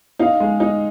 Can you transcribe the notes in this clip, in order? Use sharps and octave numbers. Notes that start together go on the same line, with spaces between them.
D#4 F5
G#3
D#4